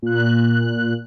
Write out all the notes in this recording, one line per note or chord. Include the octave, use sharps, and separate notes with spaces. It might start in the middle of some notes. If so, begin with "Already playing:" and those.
A#2 F#6